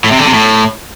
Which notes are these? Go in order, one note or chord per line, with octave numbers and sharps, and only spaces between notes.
A2
C3
D3
C3
A2